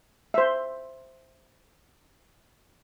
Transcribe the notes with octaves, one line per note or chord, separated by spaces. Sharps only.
C5 E5